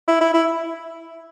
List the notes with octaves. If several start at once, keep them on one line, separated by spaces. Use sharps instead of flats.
E4
E4
E4